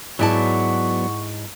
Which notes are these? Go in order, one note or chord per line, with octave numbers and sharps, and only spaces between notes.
G#2 F#3 B3 E4 D5 F#5 A5 C#6